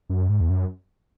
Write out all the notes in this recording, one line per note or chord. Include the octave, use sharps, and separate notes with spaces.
F#2
G#2
E2
F#2